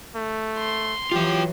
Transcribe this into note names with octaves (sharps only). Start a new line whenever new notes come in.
A3
C6
E3 F#3 F4 G4 G5